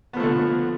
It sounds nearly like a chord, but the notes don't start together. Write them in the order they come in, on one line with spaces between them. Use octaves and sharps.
B3 F3 A3 D3